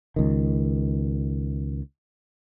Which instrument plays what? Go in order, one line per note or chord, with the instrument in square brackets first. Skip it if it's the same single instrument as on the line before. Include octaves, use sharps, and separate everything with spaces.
[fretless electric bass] C#2 D#3